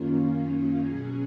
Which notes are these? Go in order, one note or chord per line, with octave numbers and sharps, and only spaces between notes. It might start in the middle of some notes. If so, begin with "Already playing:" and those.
Already playing: F#2 D#3 A#3 C#4 F4
B2 F#3 C#4 G#4